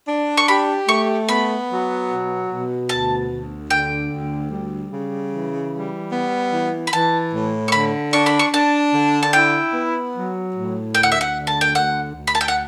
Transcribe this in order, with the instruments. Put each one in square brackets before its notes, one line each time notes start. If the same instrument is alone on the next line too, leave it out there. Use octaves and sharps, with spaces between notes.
[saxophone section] D4
[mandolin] C#6
[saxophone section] G4 [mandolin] B5
[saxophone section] A3 [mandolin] C#6
[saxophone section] B3 [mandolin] B5
[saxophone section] F#3
B2
B2
[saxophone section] D2 [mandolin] A5
[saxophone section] D2
[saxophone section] D3 [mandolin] G5
[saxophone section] D2
G3
C#3
E3
G3
B3
E3
[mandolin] B5
[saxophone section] E3 [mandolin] A5
[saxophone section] A2
[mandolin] C#6
[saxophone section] D3 [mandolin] B5
[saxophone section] D4 [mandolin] C#6
[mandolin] B5
C#6
[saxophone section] D4 [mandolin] A5
[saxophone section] D3
[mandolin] A5
[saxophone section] E4 [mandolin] G5
[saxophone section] B3
F#3
A2
[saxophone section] D2 [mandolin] G5
[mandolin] F#5
E5
F#5
[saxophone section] D3
[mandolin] A5
G5
[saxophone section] D2 [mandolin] F#5
[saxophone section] D2
[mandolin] B5
A5
G5
F#5